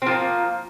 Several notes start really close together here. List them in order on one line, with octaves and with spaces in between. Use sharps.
C4 F3 A#3